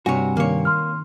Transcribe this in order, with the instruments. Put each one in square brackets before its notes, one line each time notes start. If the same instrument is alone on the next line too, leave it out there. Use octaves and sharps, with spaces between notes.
[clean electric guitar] G2 C3 [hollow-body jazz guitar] F#4 C#5 [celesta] G#5
[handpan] D#3 [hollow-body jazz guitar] A#3 C#5
[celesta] C6 F6